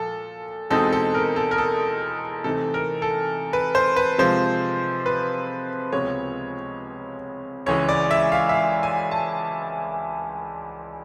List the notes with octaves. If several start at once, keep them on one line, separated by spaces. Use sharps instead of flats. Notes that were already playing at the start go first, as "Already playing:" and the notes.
Already playing: A#2 F3 A4
E2 B2 G#3 C4 D#4 A4
A4
A#4
A4
A#4
A4
C3 E3 A3 C4 D#4 A4
A#4
A4
B4
C5
B4
C3 F3 G#3 C5
B4
C#2 C3 F3 G#3 B3 C#5
C#2 C#3 E3 G#3 C#5
D5
E5
F5
E5
F5
G#5
A5